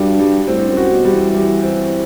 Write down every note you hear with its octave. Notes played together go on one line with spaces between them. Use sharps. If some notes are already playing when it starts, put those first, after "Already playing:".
Already playing: G2 G3 F#4
G3
A2 C4
F#2
F#4
B2
G3
E3
G3
C4